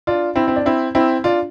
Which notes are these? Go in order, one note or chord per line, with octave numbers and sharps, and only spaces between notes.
D4 F4
C4 E4
C4
D4
C4 E4
C4 E4
D4 F4